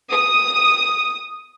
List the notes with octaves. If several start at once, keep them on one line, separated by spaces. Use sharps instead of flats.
D#6